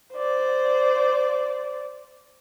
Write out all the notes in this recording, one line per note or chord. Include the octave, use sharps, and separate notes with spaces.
C5 D5